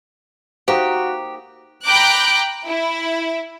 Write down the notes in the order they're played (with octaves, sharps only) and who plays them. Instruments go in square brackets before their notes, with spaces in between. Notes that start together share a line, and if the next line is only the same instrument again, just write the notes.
[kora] A#3 D#4 D#5 [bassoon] F#4 [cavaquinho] G4 [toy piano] C5 F5 A#5
[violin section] G5 A#5 B5 D6 F#6 G6
E4